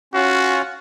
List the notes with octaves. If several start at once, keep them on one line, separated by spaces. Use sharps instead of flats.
C#4 F4 F#4 F5